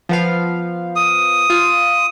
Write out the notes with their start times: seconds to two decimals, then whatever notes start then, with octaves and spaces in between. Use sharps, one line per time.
0.09 F3 B3 F5
0.96 D#6
1.50 F4